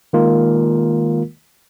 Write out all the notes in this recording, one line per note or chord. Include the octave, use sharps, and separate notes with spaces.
D#3 G#3 A#3 F4 A#4